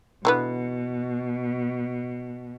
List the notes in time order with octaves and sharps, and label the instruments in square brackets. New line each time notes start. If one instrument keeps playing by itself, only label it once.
[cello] B2 [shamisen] D3 E3 B3